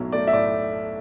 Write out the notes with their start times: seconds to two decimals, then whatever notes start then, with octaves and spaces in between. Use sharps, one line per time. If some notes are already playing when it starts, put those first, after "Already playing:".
Already playing: B1 A2 F#3 A3
0.12 A3 D5
0.27 E5
0.33 A2 D5